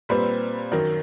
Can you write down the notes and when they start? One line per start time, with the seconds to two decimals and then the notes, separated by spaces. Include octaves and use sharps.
0.09 A#2 G3 C4 B4
0.72 F#2 D#3 F#3 A#4